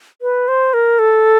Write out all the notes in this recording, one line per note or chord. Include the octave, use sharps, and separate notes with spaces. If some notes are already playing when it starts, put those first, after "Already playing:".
B4
C5
A#4
A4